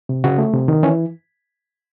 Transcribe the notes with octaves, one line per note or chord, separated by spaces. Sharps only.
C3
C#3 F#4
A3
C3
D#3
E3 C#4